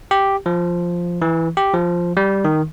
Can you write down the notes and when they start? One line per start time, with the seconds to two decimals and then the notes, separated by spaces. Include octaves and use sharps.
0.11 G4
0.46 F3
1.22 E3
1.57 G4
1.74 F3
2.17 G3
2.45 D#3